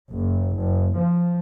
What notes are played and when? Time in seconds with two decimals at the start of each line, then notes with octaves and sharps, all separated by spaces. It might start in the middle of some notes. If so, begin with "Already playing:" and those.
0.11 F#1
0.56 F#1
0.97 F3